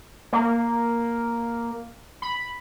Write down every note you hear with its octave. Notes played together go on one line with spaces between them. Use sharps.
A#3
B5